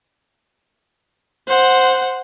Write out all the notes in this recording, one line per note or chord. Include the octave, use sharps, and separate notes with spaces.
C5 F#5